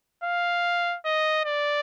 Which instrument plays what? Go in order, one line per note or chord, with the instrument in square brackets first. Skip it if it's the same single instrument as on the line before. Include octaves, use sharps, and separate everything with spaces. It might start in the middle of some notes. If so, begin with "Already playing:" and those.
[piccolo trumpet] F5
D#5
D5